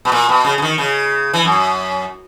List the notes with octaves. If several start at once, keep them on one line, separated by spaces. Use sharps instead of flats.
B2
A#2
B2
C#3
C#3
D#3
C#3
E3
F#2